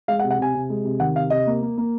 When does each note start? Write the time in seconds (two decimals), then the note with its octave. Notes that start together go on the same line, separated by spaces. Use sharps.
0.08 G#3 F5
0.19 F#5
0.24 C3
0.30 F#5
0.39 C3 G#5
0.55 C3
0.70 G#3
0.85 C3
1.00 D#3 F#5
1.16 C3 F5
1.30 C3 D#5
1.47 A#3
1.62 A#3
1.78 A#3